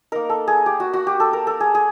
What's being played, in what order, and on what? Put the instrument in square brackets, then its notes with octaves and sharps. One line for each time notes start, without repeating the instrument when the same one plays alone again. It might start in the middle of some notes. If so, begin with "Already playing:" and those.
[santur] A#3 D#4 A#4
A4
G#4
G4
F#4
F#4
G4
A4
A#4
A4
G#4
G#4